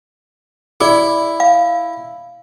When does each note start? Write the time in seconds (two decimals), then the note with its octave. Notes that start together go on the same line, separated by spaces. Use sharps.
0.81 E4 G#4 D5
1.40 F5